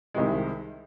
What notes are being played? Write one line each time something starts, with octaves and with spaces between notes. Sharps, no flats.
C2 C3 D#3 G#3